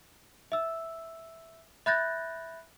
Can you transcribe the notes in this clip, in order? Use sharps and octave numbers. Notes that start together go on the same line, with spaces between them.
E5 E6
E5 B5 F#6 G6 A6 A#6